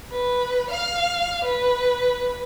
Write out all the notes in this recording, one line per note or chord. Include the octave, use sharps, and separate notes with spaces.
B4
F5
B4